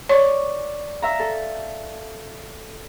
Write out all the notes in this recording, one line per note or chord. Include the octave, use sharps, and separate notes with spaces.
C#5 D5 C#6
E5 F5 A#5
A4